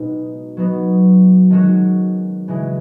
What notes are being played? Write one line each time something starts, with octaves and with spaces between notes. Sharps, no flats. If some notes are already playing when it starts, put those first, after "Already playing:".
Already playing: B2 G#3 B3 D#4
F#3 B3 D#4
D#3 G#3 C#4 F#4
C#3 E3 G#3